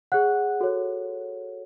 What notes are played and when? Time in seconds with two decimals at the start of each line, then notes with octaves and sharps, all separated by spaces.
0.12 G#4 C#5 F#5 F#6
0.61 F#4 A4 C#5